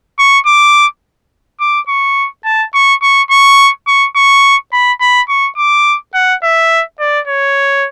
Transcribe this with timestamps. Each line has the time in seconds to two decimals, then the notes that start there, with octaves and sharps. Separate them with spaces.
0.19 C#6
0.46 D6
1.60 D6
1.88 C#6
2.45 A5
2.74 C#6
3.02 C#6
3.30 C#6
3.87 C#6
4.16 C#6
4.72 B5
5.01 B5
5.29 C#6
5.57 D6
6.14 F#5
6.43 E5
7.00 D5
7.27 C#5